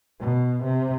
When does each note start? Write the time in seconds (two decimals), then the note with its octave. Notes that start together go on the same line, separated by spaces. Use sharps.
0.20 B2
0.64 C3